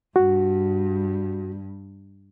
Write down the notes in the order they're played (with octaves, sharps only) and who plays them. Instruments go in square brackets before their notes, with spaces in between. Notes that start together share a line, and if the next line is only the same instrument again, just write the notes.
[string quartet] G2 [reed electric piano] F#4